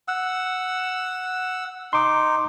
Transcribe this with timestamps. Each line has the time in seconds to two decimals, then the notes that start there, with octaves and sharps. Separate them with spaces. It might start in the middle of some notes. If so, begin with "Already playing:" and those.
0.08 F#5 E6
1.93 D#4 C6 D6